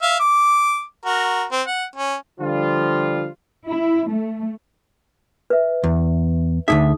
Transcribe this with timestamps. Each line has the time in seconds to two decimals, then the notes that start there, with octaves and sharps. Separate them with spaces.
0.02 E5 F5
0.20 D6
1.05 F#4 A#4
1.52 C4
1.67 F#5
1.96 C#4
2.39 D3 F3 G3 F4
3.67 E4
4.08 A3
5.50 B4 E5
5.84 E2
6.68 D2 G2 D#4 G#4 E5 D#6